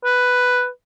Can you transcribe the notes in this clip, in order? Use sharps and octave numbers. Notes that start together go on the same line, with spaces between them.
B4